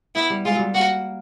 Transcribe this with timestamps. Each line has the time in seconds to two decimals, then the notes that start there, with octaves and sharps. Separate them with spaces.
0.15 B3 E4
0.30 G3
0.45 G#3 F4
0.55 F#3 G3
0.74 A#3 F#4